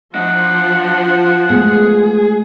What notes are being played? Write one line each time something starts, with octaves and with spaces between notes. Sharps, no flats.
F3 D4 D#5 F#5
G#3 A3 B3 G#4